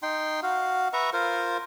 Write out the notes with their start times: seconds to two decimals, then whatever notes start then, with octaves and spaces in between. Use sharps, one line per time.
0.03 D#4 G5 C6
0.43 F#4 F5
0.93 B4 E5 A#5 C#6
1.13 F4 A#4 C5